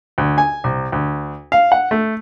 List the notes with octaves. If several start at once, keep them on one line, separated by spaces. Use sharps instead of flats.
D2
G#5
C2
D2
F5
F#5
A3